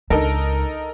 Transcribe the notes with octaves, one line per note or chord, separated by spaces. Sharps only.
C#2 D4 D#4 A4 A#4